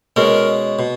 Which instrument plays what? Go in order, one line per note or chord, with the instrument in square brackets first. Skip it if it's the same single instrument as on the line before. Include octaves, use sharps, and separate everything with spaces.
[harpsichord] B2 G#3 C#4 [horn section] A#4
[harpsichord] B2